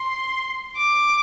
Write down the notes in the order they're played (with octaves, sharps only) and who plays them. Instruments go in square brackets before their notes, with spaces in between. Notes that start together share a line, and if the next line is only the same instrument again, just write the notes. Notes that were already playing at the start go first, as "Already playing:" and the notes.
Already playing: [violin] C6
D6